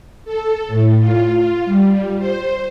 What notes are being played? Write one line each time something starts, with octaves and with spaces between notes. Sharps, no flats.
A4
A2
F4
G3
C5